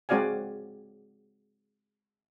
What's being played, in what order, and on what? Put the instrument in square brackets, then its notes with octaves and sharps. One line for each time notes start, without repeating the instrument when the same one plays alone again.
[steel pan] G#3 C4 F#4 D5 F5 G#5